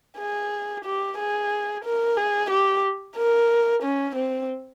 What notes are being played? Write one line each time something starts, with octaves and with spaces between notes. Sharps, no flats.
G#4
G4
G#4
A#4
G#4
G4
A#4
C#4
C4